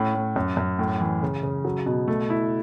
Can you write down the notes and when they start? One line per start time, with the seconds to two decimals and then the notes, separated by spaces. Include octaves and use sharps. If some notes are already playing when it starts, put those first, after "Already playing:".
Already playing: A2 C#4
0.15 A2
0.36 F#2
0.57 F#2
0.79 A2
1.01 E3
1.23 C#3
1.43 C#3
1.65 F#3
1.86 B2
2.08 A3
2.30 E4